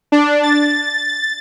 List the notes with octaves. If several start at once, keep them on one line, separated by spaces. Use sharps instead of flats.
D4
A6